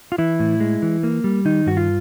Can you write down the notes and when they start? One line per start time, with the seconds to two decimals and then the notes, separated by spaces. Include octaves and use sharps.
0.12 F4
0.18 E3 E4
0.40 A2
0.60 G#3
0.82 E3
1.03 A#3
1.24 G3
1.45 D#3 D#4
1.66 G2 F#4
1.77 F4